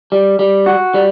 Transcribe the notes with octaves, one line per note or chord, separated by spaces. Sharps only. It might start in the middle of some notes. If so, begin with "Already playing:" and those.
G3
G3
F#4
G3